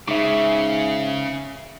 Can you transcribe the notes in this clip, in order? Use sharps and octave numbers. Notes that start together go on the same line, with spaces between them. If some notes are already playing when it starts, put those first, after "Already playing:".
G#2 C#3 E5 D6